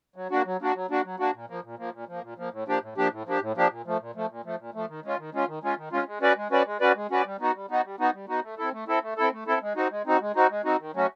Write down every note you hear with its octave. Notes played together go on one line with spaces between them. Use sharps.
F#3
A#3 D4 F#4
F#3
A#3 D4 F#4
F#3
A#3 D4 F#4
F#3
A#3 D4 F#4
A#2
F3 A#3
A#2
F3 A#3
A#2
F3 A#3
A#2
F3 A#3
A2
F3 A#3 D4 G4
A2
F3 A#3 D4 G4
A2
F3 A#3 D4 G4
A2
F3 A#3 D4 G4
A#2
F3 A3
A#2
F3 A3
A#2
F3 A3
A#2
F3 A3
D#3
G#3 C#4 F4
D#3
G#3 C#4 F4
D#3
G#3 C#4 F4
D#3
G#3 C#4 F4
G#3
C#4 F#4 B4 D5
G#3
C#4 F#4 B4 D5
G#3
C#4 F#4 B4 D5
G#3
C#4 F#4 B4 D5
G3
B3 D#4 F#4
G3
B3 D#4 F#4
G3
B3 D#4 F#4
G3
B3 D#4 F#4
A3
C4 E4 A4
A3
C4 E4 A4
A3
C4 E4 A4
A3
C4 E4 A4
G#3
C4 D#4 F#4
G#3
C4 D#4 F#4
G#3
C4 D#4 F#4
G#3
C4 D#4 F#4
D#3
F#3 A3 C#4 F#4